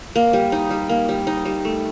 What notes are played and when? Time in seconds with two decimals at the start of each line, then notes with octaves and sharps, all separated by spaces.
0.16 A#3
0.33 G3
0.52 D#4
0.71 G3
0.89 A#3
1.09 G3
1.27 D#4
1.45 G3
1.65 A3